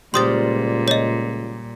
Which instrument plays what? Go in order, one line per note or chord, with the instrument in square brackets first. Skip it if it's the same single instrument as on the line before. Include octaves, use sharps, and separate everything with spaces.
[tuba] C#2 [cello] A#2 [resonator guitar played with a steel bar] G3 A#3 C5 [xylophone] C6 D#6 A6
[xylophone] C#5 D#5